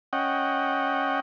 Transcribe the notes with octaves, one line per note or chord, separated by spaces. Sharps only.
C#4 D#5 F#5 G5